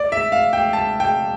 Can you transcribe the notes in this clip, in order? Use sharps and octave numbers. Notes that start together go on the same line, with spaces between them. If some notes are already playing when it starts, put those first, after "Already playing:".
Already playing: D5
E5
F5
G5
A5
G5